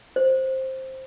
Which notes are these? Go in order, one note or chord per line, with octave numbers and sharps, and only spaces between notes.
C5